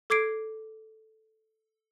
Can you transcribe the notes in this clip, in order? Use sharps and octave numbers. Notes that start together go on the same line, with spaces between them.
A4 D6 G#6 C7 D7